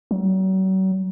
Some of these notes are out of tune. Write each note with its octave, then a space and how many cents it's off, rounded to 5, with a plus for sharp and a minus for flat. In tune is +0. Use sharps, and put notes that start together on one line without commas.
F#3 +40